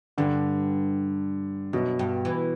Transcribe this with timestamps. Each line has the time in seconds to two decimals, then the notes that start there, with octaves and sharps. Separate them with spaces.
0.18 G2 D3
1.73 F#2 B2
1.99 G2
2.25 E3